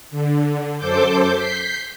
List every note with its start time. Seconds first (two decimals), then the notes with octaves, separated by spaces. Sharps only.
0.11 D3
0.77 F#2 A4 C5 D6 G6
1.33 G6 B6 C7